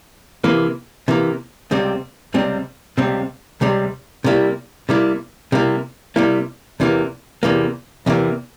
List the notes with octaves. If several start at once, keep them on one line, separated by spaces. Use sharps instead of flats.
C3 E3 A#3
C3 E3 A#3
C#2 C3 G3 C4
C#2 C3 G3 C4
C#2 C3 G3 C4
C#2 C3 G3 C4
C3 G3 A#3 E4
C3 G3 A#3 E4
C3 G3 A#3 E4
C3 G3 A#3 E4
E2 C3 E3 A#3
E2 C3 E3 A#3
E2 C3 E3 A#3